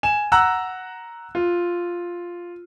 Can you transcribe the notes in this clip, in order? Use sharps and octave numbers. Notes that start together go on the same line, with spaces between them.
G#5 E7
F#5 A#5 E6 F#6
F4